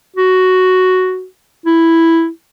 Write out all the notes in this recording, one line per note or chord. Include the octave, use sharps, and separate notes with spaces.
F#4
E4